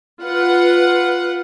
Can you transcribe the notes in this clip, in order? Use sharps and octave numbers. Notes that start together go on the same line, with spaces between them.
F4 B4 F#5